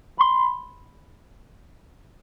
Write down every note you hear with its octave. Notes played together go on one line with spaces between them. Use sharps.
B5 C6